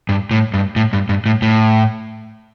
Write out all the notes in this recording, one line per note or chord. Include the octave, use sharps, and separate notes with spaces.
G2
A2
G2
A2
G2
G2
A2
A2